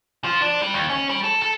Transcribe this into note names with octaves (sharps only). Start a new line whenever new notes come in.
F3
D4
G3
D#2
C#4
G3
A4
A4